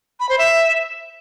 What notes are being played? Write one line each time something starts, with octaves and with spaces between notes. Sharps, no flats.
B5
C5
E5